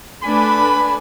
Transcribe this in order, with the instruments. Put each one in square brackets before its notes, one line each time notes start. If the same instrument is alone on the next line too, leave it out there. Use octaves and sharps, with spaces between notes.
[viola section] A3 D4 B4 [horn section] G#5 B5